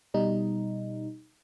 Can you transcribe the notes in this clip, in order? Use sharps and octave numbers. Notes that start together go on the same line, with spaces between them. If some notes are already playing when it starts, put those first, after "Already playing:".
B2 G3 D#4